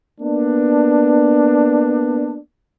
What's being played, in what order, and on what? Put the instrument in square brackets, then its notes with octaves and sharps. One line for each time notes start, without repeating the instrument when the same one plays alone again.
[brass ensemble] A#3 B3 D4